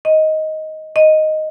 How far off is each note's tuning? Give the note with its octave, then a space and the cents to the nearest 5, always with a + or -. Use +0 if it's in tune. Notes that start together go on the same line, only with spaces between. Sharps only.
D#5 +10
D#5 +0